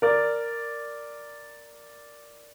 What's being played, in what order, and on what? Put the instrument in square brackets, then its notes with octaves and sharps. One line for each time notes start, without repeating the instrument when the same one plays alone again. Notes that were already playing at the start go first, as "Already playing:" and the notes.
[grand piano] A#4 D5